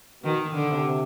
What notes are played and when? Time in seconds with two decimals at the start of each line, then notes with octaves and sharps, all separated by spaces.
0.23 B2 D#3
0.54 D3
0.70 C3